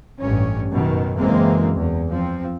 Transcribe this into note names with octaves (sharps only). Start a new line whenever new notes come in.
A1 G2 C#4
F#2 B2 D#3
F#1 E3 G#3 A#3 C4
E2
F3 C4